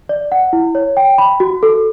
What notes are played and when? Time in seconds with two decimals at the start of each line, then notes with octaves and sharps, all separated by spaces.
0.09 D5
0.32 F#5
0.53 E4
0.75 C#5
0.97 G5
1.18 B5
1.40 F#4
1.63 A4